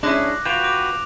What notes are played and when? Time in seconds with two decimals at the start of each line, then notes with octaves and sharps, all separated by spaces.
0.03 G#3 C#4 D4 E4 D6 F#6 A#6
0.46 F4 F#4 B4 G5 D7 E7 F7
0.64 D6